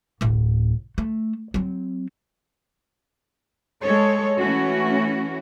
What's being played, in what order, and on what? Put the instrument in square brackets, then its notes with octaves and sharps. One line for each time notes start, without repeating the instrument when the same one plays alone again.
[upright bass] D1 A1
A3
F#3 C4
[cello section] G#3 A4 C#5
E3 A3 C#4 F#4